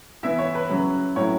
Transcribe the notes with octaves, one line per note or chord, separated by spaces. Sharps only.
E3 B3 E4 E5
C#5
B4
C#3 F#3 C#4
A2 F#3 C#4 E4 C#5